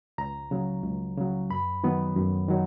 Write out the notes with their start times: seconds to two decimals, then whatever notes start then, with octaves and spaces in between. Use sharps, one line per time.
0.18 C#2 A#5
0.51 C#3 F#3
0.84 C#2
1.17 C#3 F#3
1.50 F#2 B5
1.84 D#3 F#3 B3
2.16 F#2
2.48 D#3 F#3